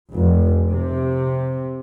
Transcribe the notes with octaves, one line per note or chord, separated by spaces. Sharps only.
F1
C3